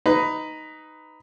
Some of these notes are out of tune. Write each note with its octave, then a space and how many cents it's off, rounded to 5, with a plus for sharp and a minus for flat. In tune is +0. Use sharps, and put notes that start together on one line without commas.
D#4 +0 B4 +15